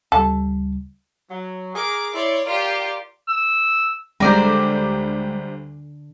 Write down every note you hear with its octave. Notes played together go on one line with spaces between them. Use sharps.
D2 C#3 G3 A4
F#3
G#4 A#4 D6
E4 C#5 D5 C6
F4 G4 A#4 D5 C6
E6
D2 D3 G3 G#3 C5 D5 A#5